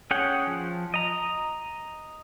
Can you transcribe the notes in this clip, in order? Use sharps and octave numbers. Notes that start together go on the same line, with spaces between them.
C#4 G#4 C#5 F#5 G5
F3
D#5 A#5